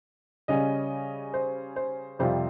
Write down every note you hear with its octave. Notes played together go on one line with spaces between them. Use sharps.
C#3 G3 C#4 D#5
C5
C5
F2 C3 G3 C4 F4 C5